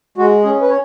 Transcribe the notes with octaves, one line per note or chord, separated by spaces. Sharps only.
G#3 F#4
C#4 G#4
B4
C#5